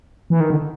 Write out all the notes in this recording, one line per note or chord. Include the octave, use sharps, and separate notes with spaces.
E3
D#3
D3